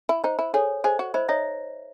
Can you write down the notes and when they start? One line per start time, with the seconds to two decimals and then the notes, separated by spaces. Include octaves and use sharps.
0.09 E4
0.24 D#4 C5
0.39 E4
0.54 G#4 A4 C#5
0.84 G#4 C5 D#5
0.99 F#4
1.14 E4 C5 D#5
1.29 D#4 C#5 E5